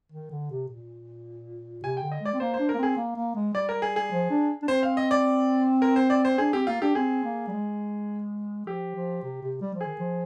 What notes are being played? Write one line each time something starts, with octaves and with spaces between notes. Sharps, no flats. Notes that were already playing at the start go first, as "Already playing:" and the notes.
D#3
D3
C3
A#2
C3 G#5
G5
D3
D#5
G#3 D5
C4
A#3 C5
C5
D4
A#3 A#4
C4 G#4
A#3
A#3
G#3
G3 D5
A#4
G#4
G#4
F3
D4
D4
C4 C5
F5
D#5
D5
A#4
C5
D5
C5
D4 G#4
C4 G4
A#3 F4
D4 G4
C4 G#4
A#3
G3
G#3
F3 G4
F3
C3
C3
G3
F3
G#4
D#3
F3